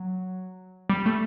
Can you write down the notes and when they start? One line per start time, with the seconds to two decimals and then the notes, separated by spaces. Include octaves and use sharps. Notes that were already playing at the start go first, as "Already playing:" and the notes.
Already playing: F#3
0.89 G3
1.06 A3